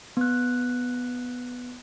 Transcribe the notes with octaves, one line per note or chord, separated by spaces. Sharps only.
B3 F#6